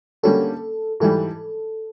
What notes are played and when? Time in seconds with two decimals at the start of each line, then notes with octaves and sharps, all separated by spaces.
0.23 D3 G3 A#3 C#4 F#4 A4
1.00 G#2 E3 G3 A4